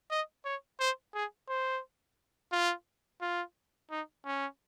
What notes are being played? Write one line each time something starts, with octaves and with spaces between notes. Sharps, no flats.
D#5
C#5
C5
G#4
C5
F4
F4
D#4
C#4